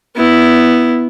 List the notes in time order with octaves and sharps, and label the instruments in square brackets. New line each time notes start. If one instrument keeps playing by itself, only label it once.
[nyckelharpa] B3 E4